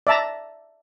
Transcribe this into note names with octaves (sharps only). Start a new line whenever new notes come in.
D5 E5 A5 A#5